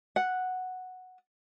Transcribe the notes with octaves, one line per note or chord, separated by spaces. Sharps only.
F#5